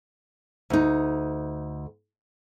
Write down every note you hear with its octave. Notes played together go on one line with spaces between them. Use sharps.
D2 D#4